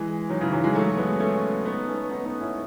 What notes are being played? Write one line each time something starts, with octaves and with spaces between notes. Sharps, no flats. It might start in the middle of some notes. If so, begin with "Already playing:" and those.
Already playing: E3 G#3
D#3 F#3
C#3 E3
D#3 F#3
E3 G#3
F#3 A3
G#3 B3
A3 C#4
B3 D#4
A3 C#4
B3 D#4
B3 D#4
C#4 E4